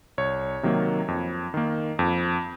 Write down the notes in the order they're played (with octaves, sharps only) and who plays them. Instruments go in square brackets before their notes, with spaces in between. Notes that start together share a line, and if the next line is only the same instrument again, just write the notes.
[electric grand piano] C2 C#5
C3 D#3 F#3 A#3
F2
D#3 A#3
F2